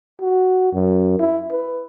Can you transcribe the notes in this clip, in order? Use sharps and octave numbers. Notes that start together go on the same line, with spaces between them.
F#4
F#2
E4
B4